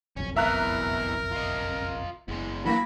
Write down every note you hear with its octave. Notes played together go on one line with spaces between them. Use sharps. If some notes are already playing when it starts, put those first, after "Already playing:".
F#1 B1 F2 C#4
B2 E3 A#4 E5 A#5 F#6
F4 D#5
F#1 E2 G#3
E3 F#3 A#3 B5 A#6